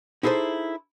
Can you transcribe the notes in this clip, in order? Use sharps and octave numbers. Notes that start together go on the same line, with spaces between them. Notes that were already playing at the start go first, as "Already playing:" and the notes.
D#4 E4 G#4 A4 C5